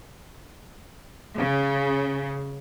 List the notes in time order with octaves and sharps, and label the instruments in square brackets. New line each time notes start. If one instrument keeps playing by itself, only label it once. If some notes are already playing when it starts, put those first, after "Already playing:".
[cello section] C#3